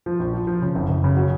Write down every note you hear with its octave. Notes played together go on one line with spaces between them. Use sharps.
F3
A#1
F3
F3
C#3
F#1
F#1
C#3
F#3